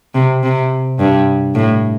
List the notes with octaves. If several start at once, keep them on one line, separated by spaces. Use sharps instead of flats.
C3
C3
G2
A2